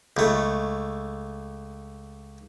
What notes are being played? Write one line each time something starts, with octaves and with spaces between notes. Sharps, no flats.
C#2 A3